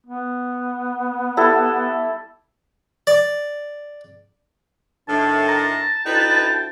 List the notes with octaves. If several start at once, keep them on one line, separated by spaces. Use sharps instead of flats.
B3
G3 E4 A4
D5
A2 D#3 D4 A5
A5 A#5
D2 D#4 E4 B4 G5